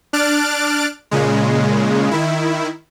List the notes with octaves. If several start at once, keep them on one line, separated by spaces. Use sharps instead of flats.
D4 F6 F#6 A6 D7
A#2 C#3 G#3
D#3 E4